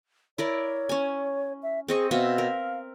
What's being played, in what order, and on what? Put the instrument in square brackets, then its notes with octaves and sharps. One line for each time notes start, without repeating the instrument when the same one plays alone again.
[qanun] E4 A#4 D5 [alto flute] C#5
[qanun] C#4 G#5
[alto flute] E5
[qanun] C4 D#5 C#6 [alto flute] G#4
[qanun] B2 C4 E5 [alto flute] F5
[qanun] A#4